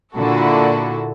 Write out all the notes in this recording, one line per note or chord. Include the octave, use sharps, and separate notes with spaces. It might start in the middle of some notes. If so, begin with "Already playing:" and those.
A#2 D3 E4 F#4 A4